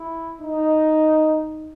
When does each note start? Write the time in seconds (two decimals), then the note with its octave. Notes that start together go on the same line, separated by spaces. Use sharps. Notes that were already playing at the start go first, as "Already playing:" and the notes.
Already playing: E4
0.41 D#4